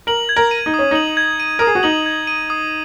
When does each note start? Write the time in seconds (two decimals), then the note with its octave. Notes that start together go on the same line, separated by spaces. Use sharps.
0.07 A#4 F#7
0.29 G#6
0.36 A#4
0.51 D#7
0.66 D#4
0.74 C#4 D#6
0.91 D#4 F#7
1.17 G#6
1.40 D#7
1.59 A#4 D#6
1.67 G#4
1.75 F#4
1.83 D#4 F#7
2.06 G#6
2.27 D#7
2.50 D#6